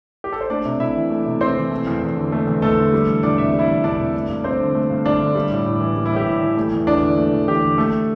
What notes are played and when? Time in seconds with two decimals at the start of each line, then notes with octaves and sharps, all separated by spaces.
0.24 G4
0.32 A4
0.41 C5
0.50 A3 D4 D5
0.66 C3
0.80 C3 E4 E5
0.96 E3
1.10 A3
1.26 C3
1.41 C3 C4 C5
1.57 E3
1.71 A3
1.87 E2
2.02 E2
2.17 D3
2.32 A3
2.47 E2
2.62 E2 A3 A4
2.77 D3
2.93 G3
3.08 E2
3.23 E2 D4 D5
3.38 C3 E5
3.53 G3
3.59 E4 E5
3.69 E2
3.83 E2 D4 D5
3.99 C3
4.14 A3
4.29 G2
4.44 G2 C4 C5
4.60 D3
4.75 A3
4.90 G2
5.05 G2 D4 D5
5.20 D3
5.35 G3
5.51 A2
5.66 A2
5.80 E3
5.96 G3
6.06 E4
6.11 A2 G4
6.26 A2
6.41 E3
6.57 A3
6.72 E2
6.87 E2 D4 D5
7.02 D3
7.17 A3
7.33 E2
7.48 E2 G4
7.63 D3
7.78 A3 A4